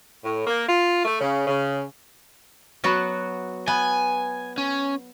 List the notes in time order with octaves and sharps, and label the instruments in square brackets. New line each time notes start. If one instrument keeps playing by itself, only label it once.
[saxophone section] A2
A#3
F4
A3
C#3
C#3
[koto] F#3 B3 F#4
[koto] B3 [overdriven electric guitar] G#5
[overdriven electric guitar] C#4